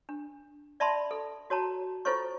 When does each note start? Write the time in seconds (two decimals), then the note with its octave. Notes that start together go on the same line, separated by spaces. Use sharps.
0.09 D4
0.80 D5 E5 A5 B5 C6
1.11 A4
1.50 F#4 C#5 A5 A#5
2.05 E4 F4 A4 C5 C#5 C#6